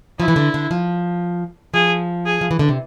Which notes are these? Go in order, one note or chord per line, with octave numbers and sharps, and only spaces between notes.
F3 E4
E3
D3
D3
F3
F3 G#4
G#4
F3
E3
D3
C3